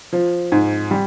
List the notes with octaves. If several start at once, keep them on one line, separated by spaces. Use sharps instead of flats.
F3
G#2
G3